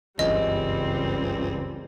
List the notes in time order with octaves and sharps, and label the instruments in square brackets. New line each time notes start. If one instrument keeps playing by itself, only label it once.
[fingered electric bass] F#1 G2 E3 [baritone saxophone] C#2 [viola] G3 C4 [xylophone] D#5